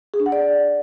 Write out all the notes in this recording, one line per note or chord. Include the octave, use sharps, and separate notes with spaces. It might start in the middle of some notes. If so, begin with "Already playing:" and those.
G#4
D4
F#5
D5